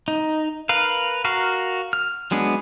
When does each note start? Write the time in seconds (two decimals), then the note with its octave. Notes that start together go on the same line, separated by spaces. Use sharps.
0.08 D#4
0.69 A#4 B4 F5
1.25 F#4 A#4 F5
1.93 F6
2.31 F#3 G#3 B3 D4